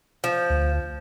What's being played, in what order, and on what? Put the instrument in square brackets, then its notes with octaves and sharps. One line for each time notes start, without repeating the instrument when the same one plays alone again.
[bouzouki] F3
[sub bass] D2